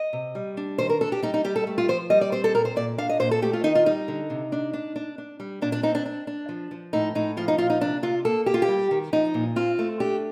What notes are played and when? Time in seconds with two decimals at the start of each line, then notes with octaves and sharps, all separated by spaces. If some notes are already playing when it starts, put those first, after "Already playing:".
Already playing: D#5
0.13 C3
0.35 G3
0.57 D4
0.78 D#3 C5
0.90 A#4
1.01 D4 A4
1.12 G4
1.23 G3 D#4
1.34 D#4
1.45 G3 G4
1.56 A4
1.67 A3
1.78 F4
1.88 F3 C5
2.10 G3 D#5
2.21 D5
2.32 C4 C5
2.44 A4
2.54 A#2 A#4
2.65 C5
2.76 A#2 D5
2.98 D4 F5
3.09 D#5
3.20 A#2 C5
3.31 A4
3.42 A3 G4
3.53 F4
3.64 D#3 D#4
3.75 F4
3.86 G3 D#4
4.08 D3
4.30 C3
4.52 D4
4.73 D4
4.96 D4
5.18 D4
5.40 G3
5.62 A#2 D4
5.72 D4
5.83 C4 D#4
5.95 D4
6.06 D4
6.27 D4
6.49 F3
6.71 F3
6.93 A2 D#4
7.15 A2 D#4
7.37 F3 F4
7.48 D#4
7.58 A#2 F4
7.70 D#4
7.81 C3 D4
8.03 C3 F4
8.25 A#3 A4
8.46 A#3 G4
8.54 F4
8.62 G4
8.68 G3
8.91 D#3
9.13 F3 D#4
9.34 A#2
9.56 C4 F4
9.79 A3
10.00 D4 G4